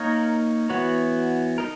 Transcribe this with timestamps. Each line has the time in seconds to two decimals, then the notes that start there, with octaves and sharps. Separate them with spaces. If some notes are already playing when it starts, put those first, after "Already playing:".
Already playing: A#3 D#4 A#4 C#5
0.70 E3 B3 F#4 C#5
1.58 D#4 A#4